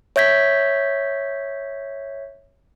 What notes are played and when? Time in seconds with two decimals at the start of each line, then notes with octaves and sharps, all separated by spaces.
0.16 C#5 E5 G6 G#6 B6